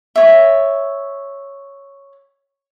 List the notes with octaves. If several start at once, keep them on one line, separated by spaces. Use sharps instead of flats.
C#5 E5